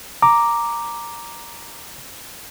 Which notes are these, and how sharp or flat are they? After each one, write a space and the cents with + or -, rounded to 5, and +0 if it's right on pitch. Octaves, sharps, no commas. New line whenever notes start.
A#5 +0 D6 +0